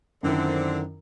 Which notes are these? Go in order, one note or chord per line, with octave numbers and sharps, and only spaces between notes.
F#2 D3 D#3 C4 E4